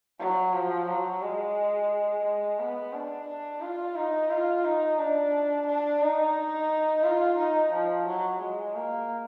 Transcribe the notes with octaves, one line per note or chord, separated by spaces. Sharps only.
F#3
F3
F#3
G#3
G#3
B3
D4
D4
F4
D#4
F4
D#4
D4
D4
D#4
F4
D#4
F3
F#3
G#3
A#3